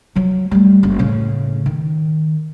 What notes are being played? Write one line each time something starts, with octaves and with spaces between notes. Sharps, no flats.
F3 F#3
G3 A3
F#1
A2 C#3
D#3